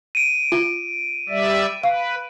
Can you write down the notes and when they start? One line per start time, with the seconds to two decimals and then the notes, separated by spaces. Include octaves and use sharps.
0.15 D7 D#7
0.52 F4
1.29 G3 D5 E5
1.83 B4 F5